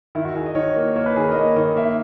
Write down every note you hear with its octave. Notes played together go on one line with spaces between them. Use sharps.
D#3 E4
F#4
D#3 G#4
D#5
D#3 C#5
A#3
A#3 C#5
B4
D#3 G#4
A#4
D#5
A#3 C#5
D#3 D#5
A#3 E5